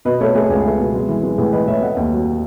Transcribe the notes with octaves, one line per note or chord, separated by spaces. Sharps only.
B2 B4 D#5
A3 A4 C#5
A3 G#4 B4
C#2 G#4 B4
A3
B2
G#3
E3
G#3
A2 G#4 B4
E3 B4 D#5
A2 C#5 E5
A3 D#5 F#5
D#2
F#3